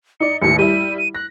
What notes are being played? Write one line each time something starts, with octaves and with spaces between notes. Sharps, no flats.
D#4 D5 C#7
A1 D#2 C#7
G3 E4 D#7
D#7
F#6 A#6